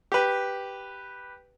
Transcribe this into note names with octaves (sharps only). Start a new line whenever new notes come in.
G4 B4